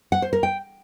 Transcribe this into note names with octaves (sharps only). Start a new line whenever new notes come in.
F#5
C5
A#4
G5